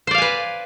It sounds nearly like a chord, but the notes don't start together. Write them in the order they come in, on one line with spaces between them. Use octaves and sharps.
C5 D5 F5 G#5 B4